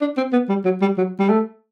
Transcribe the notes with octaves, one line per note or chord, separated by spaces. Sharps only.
D4
C4
B3
G3
F#3
G3
F#3
G3
A3